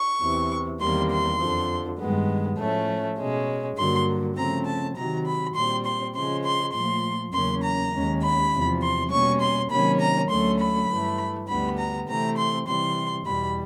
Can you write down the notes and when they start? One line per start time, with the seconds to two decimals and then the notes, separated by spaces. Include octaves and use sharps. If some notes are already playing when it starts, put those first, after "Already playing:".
Already playing: C#6
0.21 E2 C3 E3
0.80 E2 C3 D#3 G3 A#3 C6
1.11 C6
1.40 F2 D3 F3
1.99 G2 D#3 G#3 B3
2.58 A2 F3 A3 C#4
3.18 B2 G#3 C#4
3.77 G2 D3 F#3 A#3 C6
4.36 C#3 F3 A3 C4 A#5
4.66 A5
4.96 C3 D#3 F#3 A#5
5.26 B5
5.54 A#2 G3 C4 C6
5.85 C6
6.14 C#3 F3 G#3 C6
6.44 C6
6.73 A#2 F3 A3 C6
7.33 E2 C#3 F#3 A#3 C#4 C6
7.62 A#5
7.92 D#2 D#3 G#3 C#4
8.22 B5
8.52 E2 C3 F3
8.82 C6
9.11 B2 G3 A#3 C#4 C#6
9.40 C6
9.70 C3 D#3 F#3 A#3 C#4 B5
10.00 A#5
10.29 D2 D3 F#3 A3 C#4 C6
10.59 B5
10.88 G2 E3 A3
11.48 D2 D3 G3 B3 B5
11.78 A#5
12.07 C3 E3 A3 C4 A#5
12.37 C6
12.67 C3 E3 G3 C6
13.26 E2 B2 G3 B5